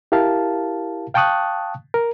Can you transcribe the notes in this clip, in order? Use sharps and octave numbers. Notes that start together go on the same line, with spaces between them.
E4 G4 A#4 F5 A5
F5 G5 A5 C#6 D#6 F#6
A#4